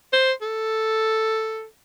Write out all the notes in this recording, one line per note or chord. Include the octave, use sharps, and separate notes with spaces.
C5
A4